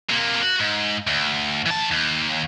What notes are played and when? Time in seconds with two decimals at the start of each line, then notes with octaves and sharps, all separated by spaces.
0.09 C3 A#3
0.42 F#4
0.60 G#2
1.07 D2
1.66 E3 A5
1.92 D#2